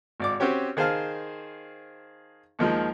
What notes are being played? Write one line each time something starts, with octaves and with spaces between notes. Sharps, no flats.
G#1 D5 D6
C4 C#4 F#4 G4 C#5
D#3 G#4 C5 F5 A5 F6
D#2 D#3 F3 G#3